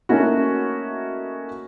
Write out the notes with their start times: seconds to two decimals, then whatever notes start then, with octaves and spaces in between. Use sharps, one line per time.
0.09 A3 A#3 C#4 D#4 E4 F#4